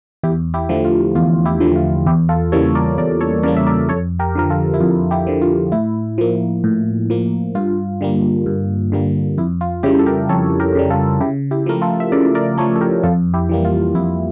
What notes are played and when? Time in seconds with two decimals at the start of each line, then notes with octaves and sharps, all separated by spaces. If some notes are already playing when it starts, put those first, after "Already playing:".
0.23 E2 E4 G4
0.54 E4 G4
0.69 D3 F3 A3
0.85 F4
1.15 E2 F4
1.46 E4 G4
1.60 D3 F3 A3
1.76 F4
2.06 E2 E4 G4
2.29 F4 A4
2.52 C#3 E3 G3 A#3 A4 C#5
2.75 A#4 D5
2.98 E2 A#4 D5
3.21 A4 C#5
3.43 C#3 E3 G3 A#3 A#4 D5
3.57 E5
3.67 A#4 D5
3.89 F2 A4 C#5
4.19 G4 A#4
4.35 D3 F3 A#4
4.50 F4 A4
4.74 E4
4.80 F2 F4
5.11 E4 G4
5.27 D3 F3
5.42 F4
5.72 A2 E4
6.18 F3 A#3
6.64 A2
7.10 F3 A#3
7.55 G2 F4
8.01 D3 G3 A#3
8.46 G2
8.92 D3 G3 A#3
9.38 F2 E4
9.61 F4
9.83 C#3 G3 E4 G4
9.99 A4
10.06 G4 A#4
10.29 F2 A4 C#5
10.60 G4 A#4
10.75 C#3 G3
10.90 F4 A4
11.20 C#3 E4 G4
11.51 E4 G4
11.66 F3 A3 A#4
11.82 F4 A4
12.00 E5
12.12 C#3 A#4 D5
12.35 A#4 D5
12.58 F3 A3 A4 C#5
12.76 A4
12.81 G4 A#4
13.04 F2 F4 A4
13.34 E4 G4
13.49 E3 G3 A#3
13.65 F4
13.95 F2 E4